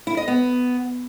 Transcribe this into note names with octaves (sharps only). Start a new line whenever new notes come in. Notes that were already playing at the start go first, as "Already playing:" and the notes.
E4
D#5
B3